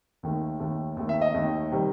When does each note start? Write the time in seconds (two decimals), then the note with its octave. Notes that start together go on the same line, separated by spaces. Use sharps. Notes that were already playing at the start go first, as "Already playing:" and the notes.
0.23 D#2 D#3 A3
0.60 D#2 D#3 A3
0.97 D#2 D#3 A3
1.09 E5
1.21 D#5
1.34 D#2 D#3 A3
1.71 C3 D#3 G3